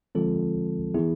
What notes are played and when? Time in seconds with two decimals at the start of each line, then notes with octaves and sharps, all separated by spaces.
0.15 D3 F3 G#3 C4 F4 A4
0.94 E3 B3 E4 G#4